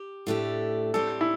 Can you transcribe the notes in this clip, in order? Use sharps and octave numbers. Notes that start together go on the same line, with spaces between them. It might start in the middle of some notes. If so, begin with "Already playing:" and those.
Already playing: G4
A2 A3 D4 G4
A2 G3 C4 G4 A4
E4